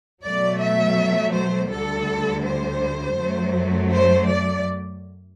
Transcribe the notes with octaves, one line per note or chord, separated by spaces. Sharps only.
B2 F#3 A3 D5
E5
C5
D2 D3 G3 A4
C5
F#2 F#3 A3
C5
D5